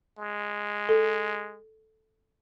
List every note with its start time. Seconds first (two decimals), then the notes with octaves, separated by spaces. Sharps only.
0.19 G#3
0.89 A4